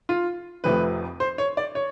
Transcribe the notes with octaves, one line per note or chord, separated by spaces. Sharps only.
F4
F1 F2 C3 F3 A3 B4
C5
C#5
D5
C#5